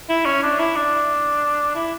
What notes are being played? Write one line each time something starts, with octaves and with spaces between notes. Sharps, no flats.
E4
C#4
D4
E4
D4
E4